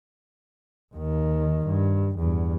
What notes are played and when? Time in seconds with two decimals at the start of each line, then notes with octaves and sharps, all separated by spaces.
0.95 D#2 D#3
1.66 G2
2.19 E2 G2